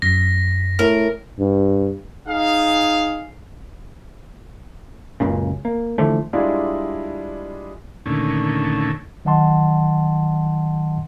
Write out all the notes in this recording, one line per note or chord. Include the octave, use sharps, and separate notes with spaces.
F#2 A#6 B6
A2 A#4
G2
D#4 G#4 F5
F#1 C#2 A#2 C#3
A#3
D3 E3 F3 A3
G3 G#3 D4 E4 F4 G#4
D#2 A#2 D3 A3 C#4
D#3 F#3 D#5 F#5 A5 C6